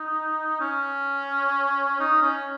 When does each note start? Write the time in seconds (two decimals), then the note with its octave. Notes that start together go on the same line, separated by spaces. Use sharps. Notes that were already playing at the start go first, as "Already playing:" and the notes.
Already playing: D#4
0.61 C#4
2.00 D#4
2.22 C#4